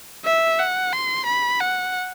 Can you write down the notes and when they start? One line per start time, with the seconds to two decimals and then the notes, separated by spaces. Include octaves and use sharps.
0.25 E5
0.59 F#5
0.93 C6
1.26 B5
1.60 F#5